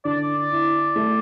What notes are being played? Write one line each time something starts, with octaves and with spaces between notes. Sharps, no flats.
D3 D5
E4
A3